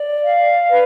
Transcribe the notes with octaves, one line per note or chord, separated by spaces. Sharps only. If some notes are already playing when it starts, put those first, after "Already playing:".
Already playing: D5
F5
B4